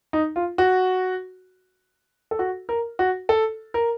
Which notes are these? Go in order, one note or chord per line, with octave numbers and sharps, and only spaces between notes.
D#4
F4
F#4
A4
F#4
A#4
F#4
A4
A#4